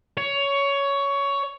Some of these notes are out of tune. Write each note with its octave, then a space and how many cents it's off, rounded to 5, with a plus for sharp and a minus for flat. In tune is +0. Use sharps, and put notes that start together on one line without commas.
C#5 +15